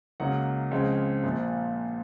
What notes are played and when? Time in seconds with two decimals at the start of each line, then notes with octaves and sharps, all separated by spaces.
0.20 C#2 C#3 F#3 A#3 F#5
0.71 C#2 C#3 F3 G#3 C4
1.24 A#1 A#2 F3